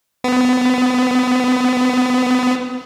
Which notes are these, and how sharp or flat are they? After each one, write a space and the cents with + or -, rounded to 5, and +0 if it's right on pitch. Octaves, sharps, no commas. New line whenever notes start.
B3 +30